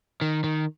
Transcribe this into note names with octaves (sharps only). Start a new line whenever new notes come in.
D#3
D#3